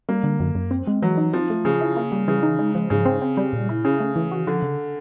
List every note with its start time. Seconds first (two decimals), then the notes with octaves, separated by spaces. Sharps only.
0.09 G3 A#3
0.23 D3
0.40 F#2
0.55 F#2
0.71 C4
0.87 G#3
1.02 E3 F#3
1.17 D#4
1.33 F3 C4
1.50 A3
1.65 C#3 F3
1.81 E4
1.96 A#3
2.12 G3
2.28 C#3 E3
2.43 D#4
2.59 G#3
2.75 F3
2.90 G#2 C#3
3.05 C4
3.22 C4
3.37 G3
3.53 A#2
3.69 E4
3.84 C#3 C#4
4.00 A3
4.16 E3
4.31 F#4
4.47 D3 F3
4.62 C#3